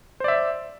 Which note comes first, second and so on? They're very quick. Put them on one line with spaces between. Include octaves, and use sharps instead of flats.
C5 D5 E5